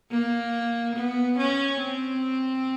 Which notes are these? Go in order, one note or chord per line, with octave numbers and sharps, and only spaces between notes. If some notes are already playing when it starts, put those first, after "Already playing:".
A#3
B3
C#4
C4